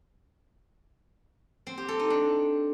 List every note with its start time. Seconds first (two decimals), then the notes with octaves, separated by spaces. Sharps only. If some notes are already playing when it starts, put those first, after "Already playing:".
1.67 C4
1.78 G4
1.88 A4
1.99 D#4
2.10 D4